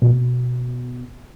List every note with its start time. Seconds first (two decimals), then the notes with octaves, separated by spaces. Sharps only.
0.02 B2